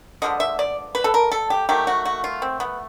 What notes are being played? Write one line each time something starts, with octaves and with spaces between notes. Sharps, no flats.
D3 F3 G#3 B3 D#5
E5
D5
B4
A4
A#4
A4
G4
D#3 F#3 A3 G4
F#4
F#4
F4
C4
B3